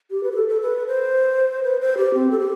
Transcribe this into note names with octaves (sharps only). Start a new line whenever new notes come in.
G4
B4
G4
A4
A4
B4
C5
B4
C5
G4
C4
A4
G4